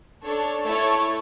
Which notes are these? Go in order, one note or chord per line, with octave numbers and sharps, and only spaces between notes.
D4 A4 C#5
A3 E4 A4 C#5